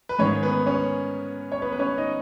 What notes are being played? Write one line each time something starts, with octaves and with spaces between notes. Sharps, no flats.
B4
G#2 D#3 C#4 C#5
B3 B4
C#4 C#5
C#5
B3 B4
B4
C#4 C#5
D#4 D#5